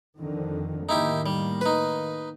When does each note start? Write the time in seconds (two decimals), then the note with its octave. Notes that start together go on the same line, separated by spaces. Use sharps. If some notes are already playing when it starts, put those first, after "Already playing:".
0.19 F2 D3 D#3
0.89 A2 D#3 A#3 D#4 E4 G4
1.26 G3
1.61 D#4 B4